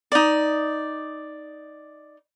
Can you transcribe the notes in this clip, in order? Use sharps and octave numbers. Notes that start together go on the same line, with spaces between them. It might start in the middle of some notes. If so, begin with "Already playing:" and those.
D#4 D5